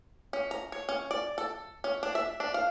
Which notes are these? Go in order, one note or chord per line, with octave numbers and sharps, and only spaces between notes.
C#4
A#5
C#5
C#4
D5
A4
C#4
D4
E5
D4
F5